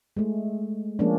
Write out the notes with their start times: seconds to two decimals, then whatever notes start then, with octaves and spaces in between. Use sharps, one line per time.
0.17 G#3 A3
0.99 F3 G#3 A#3 C#4 D4